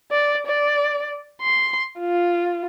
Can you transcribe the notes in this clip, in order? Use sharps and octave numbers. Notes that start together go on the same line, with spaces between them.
D5
D5
C6
F4